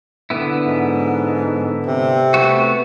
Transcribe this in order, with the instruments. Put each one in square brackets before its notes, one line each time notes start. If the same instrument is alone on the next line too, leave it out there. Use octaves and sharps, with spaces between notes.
[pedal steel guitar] D3 B3 E4
[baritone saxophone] G#2
C3
[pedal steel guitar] A3 B3 F#4